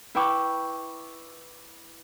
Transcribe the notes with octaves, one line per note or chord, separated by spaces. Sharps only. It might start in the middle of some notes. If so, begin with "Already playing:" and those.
E4 B4 G5 C#6 D6